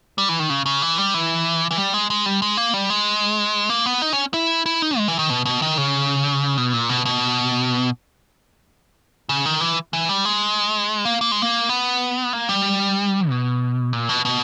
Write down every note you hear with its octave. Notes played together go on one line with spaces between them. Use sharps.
G3
E3
D#3
C#3
C#3
E3
G3
E3
E3
G3
G#3
G#3
G3
G#3
A#3
G3
G#3
A#3
B3
D#4
C#4
E4
E4
D#4
G#3
E3
D#3
B2
B2
D#3
C#3
B2
A#2
B2
B2
C#3
D#3
E3
E3
G3
G#3
A#3
A#3
G#3
A#3
B3
A#3
G3
B2
A#2
B2
B2